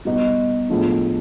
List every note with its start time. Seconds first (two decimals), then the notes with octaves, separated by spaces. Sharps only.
0.05 B2 G3 B3 D#4
0.69 A2 F3 G#3 B3 D4